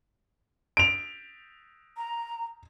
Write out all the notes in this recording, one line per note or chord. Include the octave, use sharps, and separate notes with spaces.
D7 F7
A#5